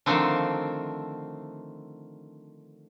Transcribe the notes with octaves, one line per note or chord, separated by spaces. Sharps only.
D3 D#3 F3 A3 C4 D4